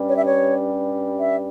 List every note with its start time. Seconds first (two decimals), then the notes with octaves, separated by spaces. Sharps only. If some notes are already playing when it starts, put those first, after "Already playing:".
Already playing: G2 G3 C#4
0.10 C#5
0.18 E5
0.26 C#5
1.21 E5